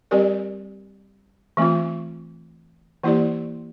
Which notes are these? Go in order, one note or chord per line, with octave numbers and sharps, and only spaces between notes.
G3 C4 G4 A#4 D5
E3 A3 C4 F4
E3 A#3 E4 G4 D5